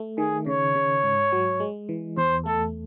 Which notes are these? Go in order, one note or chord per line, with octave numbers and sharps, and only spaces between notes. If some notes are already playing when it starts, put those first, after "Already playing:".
Already playing: A3
D#3 G#4
C#3 C#5
C#3
G#2
F#3
G#3
E3
E2 C5
A3 A4